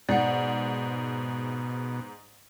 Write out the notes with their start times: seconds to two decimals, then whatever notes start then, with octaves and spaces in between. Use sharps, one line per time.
0.09 G#2 B2 D5 F#5